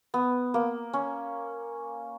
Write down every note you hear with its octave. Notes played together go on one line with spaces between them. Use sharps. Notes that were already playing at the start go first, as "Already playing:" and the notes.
B3
A#3
C#4